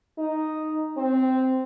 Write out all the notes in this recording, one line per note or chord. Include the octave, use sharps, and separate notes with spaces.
D#4
C4